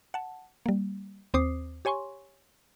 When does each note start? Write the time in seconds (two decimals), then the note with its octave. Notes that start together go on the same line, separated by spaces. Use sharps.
0.14 F#5 A5
0.66 G3 A#3
1.34 D#2 C4 C5 D6 D#6 C7
1.85 G4 C#5 G#5 C6 C#6